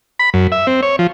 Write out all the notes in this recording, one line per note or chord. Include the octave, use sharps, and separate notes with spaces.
B5
F#2
E5
C4
C#5
F3